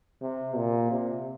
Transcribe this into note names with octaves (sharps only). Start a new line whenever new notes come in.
C3
A#2
C3